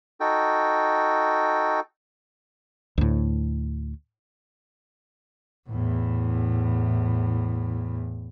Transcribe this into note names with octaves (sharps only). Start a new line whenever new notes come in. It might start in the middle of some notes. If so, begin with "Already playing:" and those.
D#4 F#4 A4 G5
D2 A2
E2 A2